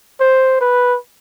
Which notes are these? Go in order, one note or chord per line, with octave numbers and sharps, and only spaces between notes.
C5
B4